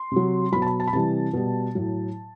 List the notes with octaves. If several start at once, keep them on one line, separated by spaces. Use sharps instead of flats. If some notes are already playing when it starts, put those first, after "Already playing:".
Already playing: C6
C3 F#3
B2 F#3 B5
A5
B5
A5
B5
C3 E3 G3 A5
B2 G3
A2 F#3